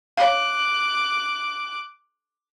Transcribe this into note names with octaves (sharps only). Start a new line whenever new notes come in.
C#5 F5 D6 F#6